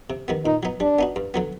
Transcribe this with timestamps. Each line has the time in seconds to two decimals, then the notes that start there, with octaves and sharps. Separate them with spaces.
0.10 C3
0.28 D#3 G3 B3
0.45 A#2 D#4
0.63 F#3 B3 D#4
0.80 G3 D4
0.99 B3 D#4 F#4
1.16 G2
1.34 D3 F#3 B3